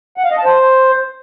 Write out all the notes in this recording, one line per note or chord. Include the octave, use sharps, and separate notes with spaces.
F#5
F5
D#5
A5
C5